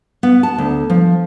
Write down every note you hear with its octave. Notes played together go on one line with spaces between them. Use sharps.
B3
A5
D2
F3